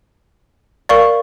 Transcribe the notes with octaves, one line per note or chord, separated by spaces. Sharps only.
A#4 D5 F5 C#6